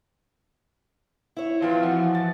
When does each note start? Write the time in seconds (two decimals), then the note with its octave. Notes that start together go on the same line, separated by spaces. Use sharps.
1.37 E4 C#5
1.61 A#2 F3 C4 B4 F5
1.83 E3 F3 F#4
2.15 A6